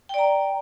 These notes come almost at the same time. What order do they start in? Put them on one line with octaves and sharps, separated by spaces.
G5 D5 A#5